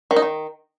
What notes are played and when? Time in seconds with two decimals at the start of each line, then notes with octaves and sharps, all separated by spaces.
0.11 D#3
0.16 D#4
0.22 D#3